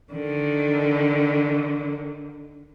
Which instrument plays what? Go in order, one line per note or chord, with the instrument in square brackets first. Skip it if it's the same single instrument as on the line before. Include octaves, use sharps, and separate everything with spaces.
[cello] D3 D#3